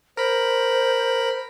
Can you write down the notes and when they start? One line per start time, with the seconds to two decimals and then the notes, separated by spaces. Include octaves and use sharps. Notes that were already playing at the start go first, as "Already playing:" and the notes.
0.17 A#4 C5 B5